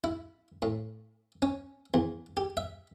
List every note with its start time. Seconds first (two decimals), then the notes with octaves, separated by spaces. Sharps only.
0.04 E4
0.62 A2
1.42 C#4
1.94 E2
2.37 G4
2.57 E5